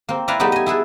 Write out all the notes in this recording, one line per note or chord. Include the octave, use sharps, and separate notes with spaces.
A#3 C4
E4 B4 D5 F5 A#5
G3 A3 B3 D#4 G4 D5
D#5 G#5
E4 G#4 A4 B4